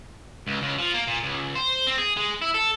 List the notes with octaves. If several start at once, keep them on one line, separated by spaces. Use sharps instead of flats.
C#2
C#2
F3
A#3
A#2
C#2
C5
C4
G#4
G#3
E4
A4